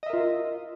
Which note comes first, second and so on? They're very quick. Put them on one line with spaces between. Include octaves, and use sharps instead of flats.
D#5 E5 A#4 F4